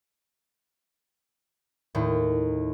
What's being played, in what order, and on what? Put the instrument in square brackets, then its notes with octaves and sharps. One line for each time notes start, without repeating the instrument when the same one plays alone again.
[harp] D#2 A2